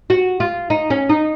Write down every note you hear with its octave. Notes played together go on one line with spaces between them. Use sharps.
F#4
F4
D#4
C#4
D#4